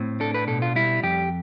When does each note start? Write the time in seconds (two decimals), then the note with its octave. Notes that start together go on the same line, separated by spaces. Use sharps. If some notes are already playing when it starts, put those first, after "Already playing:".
Already playing: A2 C4
0.20 D4 A4
0.34 B4
0.47 B2 A4
0.62 F4
0.76 G3 E4
1.03 F2 G4